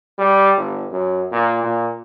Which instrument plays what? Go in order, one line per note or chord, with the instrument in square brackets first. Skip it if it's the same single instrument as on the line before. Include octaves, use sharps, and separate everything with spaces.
[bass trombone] G3
G1
F#2
A#2
A#2